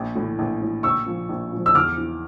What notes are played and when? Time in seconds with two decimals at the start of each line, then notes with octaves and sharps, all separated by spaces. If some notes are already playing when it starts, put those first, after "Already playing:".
Already playing: A#1
0.15 A2 E3
0.39 A#1
0.62 A2 E3
0.83 A#1 C#6 E6
1.06 A#2 F3
1.29 A#1
1.52 A#2 F3
1.66 E6
1.75 E2 D6 F6
1.98 E3